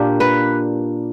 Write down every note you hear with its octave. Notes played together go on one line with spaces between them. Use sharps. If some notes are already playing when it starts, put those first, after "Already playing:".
Already playing: A#2 A#3 D4 G4
B4